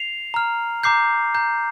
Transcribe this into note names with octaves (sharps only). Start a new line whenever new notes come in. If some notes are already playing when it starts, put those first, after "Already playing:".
Already playing: C7 F7
A#5 F6
A#5 D6 G6 C7
A#5 G6